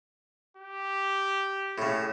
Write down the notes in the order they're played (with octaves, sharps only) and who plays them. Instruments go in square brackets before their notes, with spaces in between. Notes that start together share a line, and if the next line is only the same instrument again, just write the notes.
[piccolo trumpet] G4
[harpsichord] A2 C#3